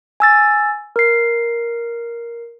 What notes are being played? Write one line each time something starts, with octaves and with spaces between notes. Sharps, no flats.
G#5 E6 A6
A#4 C7